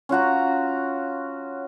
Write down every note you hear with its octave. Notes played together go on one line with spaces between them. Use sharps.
C#4 F4 F#4 A#5